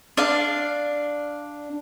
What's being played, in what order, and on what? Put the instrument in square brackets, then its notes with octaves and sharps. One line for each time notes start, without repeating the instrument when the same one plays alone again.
[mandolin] D4 F5